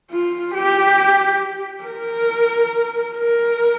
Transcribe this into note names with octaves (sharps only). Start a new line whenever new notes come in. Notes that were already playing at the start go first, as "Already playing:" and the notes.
F4
G4
A#4
A#4